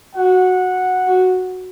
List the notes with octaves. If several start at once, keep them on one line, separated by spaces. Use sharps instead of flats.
F#4 F#5
F#4